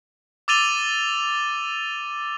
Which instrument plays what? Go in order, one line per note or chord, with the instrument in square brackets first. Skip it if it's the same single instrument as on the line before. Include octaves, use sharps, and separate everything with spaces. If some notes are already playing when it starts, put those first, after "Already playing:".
[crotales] D6 E6 A6 D#7 F7 G7